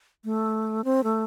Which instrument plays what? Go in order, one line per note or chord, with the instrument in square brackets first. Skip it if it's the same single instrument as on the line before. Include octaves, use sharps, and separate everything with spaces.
[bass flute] A3
C4
A3